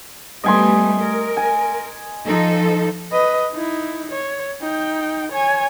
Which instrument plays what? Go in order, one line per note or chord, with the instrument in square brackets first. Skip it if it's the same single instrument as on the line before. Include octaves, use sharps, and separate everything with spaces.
[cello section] G3 A3 B3 [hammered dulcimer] D#5 G#5 C6
[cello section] A#4
[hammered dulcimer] G#5
[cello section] F3 D#4 A4
[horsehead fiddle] B4 D#5
D#4 E4
C#5
D#4 G5
C#5 G#5